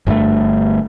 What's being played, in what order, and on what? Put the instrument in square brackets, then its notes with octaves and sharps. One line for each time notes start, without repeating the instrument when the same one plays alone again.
[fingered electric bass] G1 G2 C#3 A3